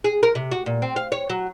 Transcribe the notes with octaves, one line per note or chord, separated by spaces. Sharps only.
G#4
A#4
C3
F#4
A#2
C4
F5
C#5
F#3